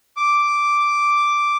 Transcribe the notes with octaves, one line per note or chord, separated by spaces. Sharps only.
D6